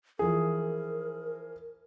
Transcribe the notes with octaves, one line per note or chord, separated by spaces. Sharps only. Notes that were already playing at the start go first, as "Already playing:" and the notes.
E3 F3 G#4 A#4